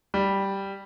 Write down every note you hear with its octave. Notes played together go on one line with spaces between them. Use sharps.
G3